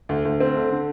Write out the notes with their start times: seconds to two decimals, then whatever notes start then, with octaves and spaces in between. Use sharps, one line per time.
0.09 D2
0.25 D2
0.40 C4
0.56 D3
0.71 D3